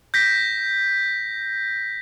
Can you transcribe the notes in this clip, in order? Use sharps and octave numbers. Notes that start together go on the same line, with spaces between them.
G6 A#6 B6